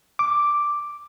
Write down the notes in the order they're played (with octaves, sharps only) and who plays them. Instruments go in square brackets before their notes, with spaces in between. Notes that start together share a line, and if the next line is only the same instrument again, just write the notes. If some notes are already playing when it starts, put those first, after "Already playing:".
[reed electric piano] D6